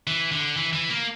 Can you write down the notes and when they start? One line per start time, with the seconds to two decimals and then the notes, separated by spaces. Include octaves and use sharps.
0.07 E3
0.32 D3
0.57 E3
0.73 E3
0.90 A#3